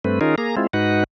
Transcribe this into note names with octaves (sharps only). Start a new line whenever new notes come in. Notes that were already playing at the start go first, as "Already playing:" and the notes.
G2 A3 C4 B4
D#3 C#4 D#4 F4 G#4 A#4
A#3 G#4 A#5
G#3 C4 E4 F4
G#2 D#4 F#4 B4 F#5